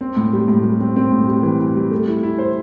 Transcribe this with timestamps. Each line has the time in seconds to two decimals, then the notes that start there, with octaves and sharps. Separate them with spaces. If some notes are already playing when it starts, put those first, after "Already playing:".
0.01 C4
0.16 A2
0.33 G3
0.48 A2
0.64 G3
0.80 C4
0.96 C4
1.12 A2
1.28 G3
1.43 E3
1.60 E3
1.75 G3
1.91 A3
2.07 E4
2.23 E4
2.38 C5